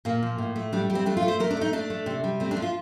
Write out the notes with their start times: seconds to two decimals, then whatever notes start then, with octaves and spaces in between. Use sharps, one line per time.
0.05 A#2 A#3
0.23 F3
0.38 A2
0.56 A3
0.73 G3 D4
0.90 G3
0.95 C4
1.06 A3 D4
1.17 F4
1.23 A3
1.28 C5
1.40 A3 A#4
1.51 D4
1.57 A3 D#4
1.73 A3 D4
1.90 A3
2.06 C3
2.24 G3
2.40 A3 C4
2.51 D4
2.57 F3
2.62 F4